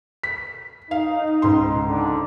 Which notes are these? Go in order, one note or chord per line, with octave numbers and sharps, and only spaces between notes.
B6
D#4 F5
C#2 G#2 C6
D3 D4 D#4